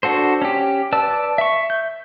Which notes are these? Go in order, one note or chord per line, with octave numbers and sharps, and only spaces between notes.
D4 F#4 A4 C5
C#4 G4
B4 D5 A5 E6
E5 C#6
G6